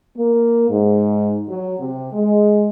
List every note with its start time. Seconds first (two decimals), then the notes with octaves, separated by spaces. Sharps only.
0.17 A#3
0.69 G#2
1.48 F#3
1.79 C3
2.13 G#3